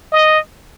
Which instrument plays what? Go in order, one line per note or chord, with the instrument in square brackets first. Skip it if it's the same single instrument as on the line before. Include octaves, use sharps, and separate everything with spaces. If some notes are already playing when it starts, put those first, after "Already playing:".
[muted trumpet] D#5